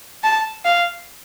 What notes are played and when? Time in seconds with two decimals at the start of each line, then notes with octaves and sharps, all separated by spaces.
0.23 A5
0.65 F5